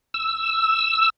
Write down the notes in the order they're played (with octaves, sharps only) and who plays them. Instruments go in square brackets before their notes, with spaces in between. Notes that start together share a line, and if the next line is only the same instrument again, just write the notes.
[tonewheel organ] E6